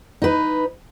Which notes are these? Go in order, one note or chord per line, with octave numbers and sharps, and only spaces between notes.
D#4 B4